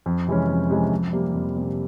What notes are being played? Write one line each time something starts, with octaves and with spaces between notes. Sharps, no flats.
F2
C3 E3 G#3 C#4
F2
C3 E3 G#3 C#4
F2
C3 G3 A#3
F2
C3 G3 A#3